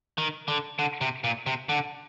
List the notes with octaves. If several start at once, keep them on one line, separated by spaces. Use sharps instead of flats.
D#3
D3
D3
C3
A#2
C3
D3